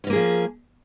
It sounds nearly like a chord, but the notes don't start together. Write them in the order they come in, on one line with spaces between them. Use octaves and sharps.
C#4 C4 A#3 G#4 F3